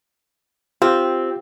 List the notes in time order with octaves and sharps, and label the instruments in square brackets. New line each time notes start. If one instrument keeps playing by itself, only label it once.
[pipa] C4 [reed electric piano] F4 G4